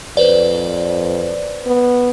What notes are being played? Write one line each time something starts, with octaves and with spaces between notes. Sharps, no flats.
F2 B4 C5 D5
B3